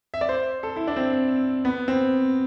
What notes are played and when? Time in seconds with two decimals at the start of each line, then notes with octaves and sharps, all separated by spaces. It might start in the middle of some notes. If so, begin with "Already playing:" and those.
0.14 E5
0.21 D5
0.29 C5
0.63 A4
0.76 E4
0.87 D4
0.96 C4
1.65 B3
1.88 C4